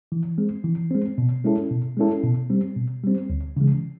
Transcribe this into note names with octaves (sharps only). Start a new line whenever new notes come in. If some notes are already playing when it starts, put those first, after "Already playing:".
E3
G#3 C4
E3
G#3 C4
B2
G#3 C#4 E4 A4
B2
G#3 C#4 E4 A4
B2
G3 C4
B2
G3 C4
D2
C#3 E3 G#3